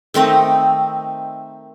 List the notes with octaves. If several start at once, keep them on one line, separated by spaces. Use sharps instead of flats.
D#3 A3 C4 D#5